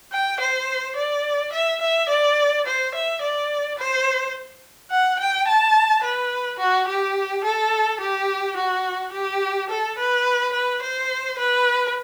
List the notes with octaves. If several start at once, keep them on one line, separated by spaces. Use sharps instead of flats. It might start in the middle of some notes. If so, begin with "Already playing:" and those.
G5
C5
D5
E5
E5
D5
C5
E5
D5
C5
F#5
G5
A5
B4
F#4
G4
A4
G4
F#4
G4
A4
B4
B4
C5
B4